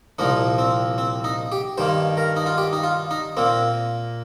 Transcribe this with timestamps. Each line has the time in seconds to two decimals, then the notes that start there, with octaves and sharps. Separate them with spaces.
0.19 C2 A#2 F3 A#3 D#4
0.58 C4
0.98 C4
1.24 D#4
1.52 G4
1.78 G2 D#3 A#3 C5
2.17 A#4
2.37 D#4
2.46 F4
2.58 G4
2.73 D#4
2.83 F4
3.11 D#4
3.37 A#2 A#3 C4